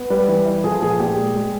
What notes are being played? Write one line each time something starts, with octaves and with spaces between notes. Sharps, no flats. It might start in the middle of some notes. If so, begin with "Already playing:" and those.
Already playing: B3
G3 B4
E3
E4
F3 G#4
A#2 G#4
A#2 G4
G#3
G#3